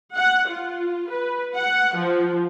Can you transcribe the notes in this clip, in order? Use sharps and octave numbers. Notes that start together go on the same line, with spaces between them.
F#5
F4
B4
F#5
F3